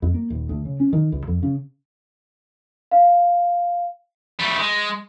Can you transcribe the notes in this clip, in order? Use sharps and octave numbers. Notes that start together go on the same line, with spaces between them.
F2
A#3
D#1
D2
C#3
C#4
D#3
C#2
F2
C#3
F5
G3 A3
G#3